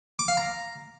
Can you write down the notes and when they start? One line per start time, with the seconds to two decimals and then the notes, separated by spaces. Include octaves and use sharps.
0.19 D6
0.28 F5
0.37 A#5